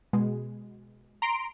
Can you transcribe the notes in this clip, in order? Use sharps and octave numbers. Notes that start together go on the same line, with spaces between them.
B2 G#3
A#5 C6 D7